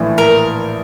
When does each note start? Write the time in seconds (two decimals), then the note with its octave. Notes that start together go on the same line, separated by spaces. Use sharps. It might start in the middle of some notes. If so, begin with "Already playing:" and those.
Already playing: A#1 A2 E3
0.18 A#4